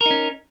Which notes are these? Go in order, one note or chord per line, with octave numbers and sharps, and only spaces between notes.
C#4 D#4 A#4